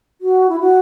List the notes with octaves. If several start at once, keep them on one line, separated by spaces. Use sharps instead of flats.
F#4
E4
F#4